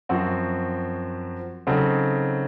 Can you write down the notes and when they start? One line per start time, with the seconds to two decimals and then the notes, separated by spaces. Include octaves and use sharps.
0.09 F#2 F3 C4 F#4
1.67 C#3 F#3 C4 D#4 A4